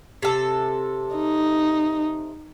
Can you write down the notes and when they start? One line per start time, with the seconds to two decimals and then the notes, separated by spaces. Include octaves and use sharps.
0.23 C3 A4
1.16 D#4